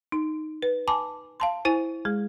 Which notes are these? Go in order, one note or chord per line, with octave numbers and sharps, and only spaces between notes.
D#4
B4
G#5 A5 B5 D6
F5 A5 C6
E4 C5 G#5
G#3 G#4